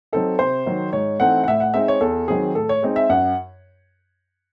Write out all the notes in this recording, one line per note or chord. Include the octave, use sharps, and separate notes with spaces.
F#3 C4 D#4 A4
C3 C5
D#3 F#3
G#2 C#5
E3 A3 C4 D#4 F#5
F#5
A2 E5
F#5
G#3 C4 D#4 E5
C#5
E2 A4
D#3 F#3 C4 G#4
A2 A4
C#5
G#3 C4 D#4
E5
F#2 F#5